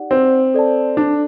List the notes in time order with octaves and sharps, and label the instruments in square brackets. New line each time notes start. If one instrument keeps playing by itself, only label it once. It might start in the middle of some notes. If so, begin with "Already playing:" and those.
Already playing: [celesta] D#4 G4 D5 F#5
[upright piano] C4
[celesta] A4 D5 A5
[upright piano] D4